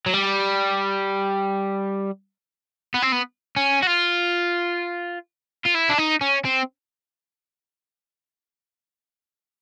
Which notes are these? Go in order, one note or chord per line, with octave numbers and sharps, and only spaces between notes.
F#3
G3
B3
C4
B3
C#4
F#4
F4
F4
E4
D4
D#4
C#4
C4